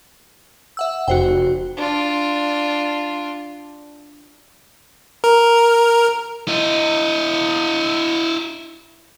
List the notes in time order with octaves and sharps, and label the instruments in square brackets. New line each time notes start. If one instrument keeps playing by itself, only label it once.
[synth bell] E5 F#5 E6
[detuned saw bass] F1 [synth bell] F#4 C5 G5
[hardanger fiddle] D4 F4
[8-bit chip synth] A#4
[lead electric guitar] E4 D#5